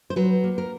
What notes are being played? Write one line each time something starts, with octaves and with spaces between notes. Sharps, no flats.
C5
F#3 B4
A#3
A#4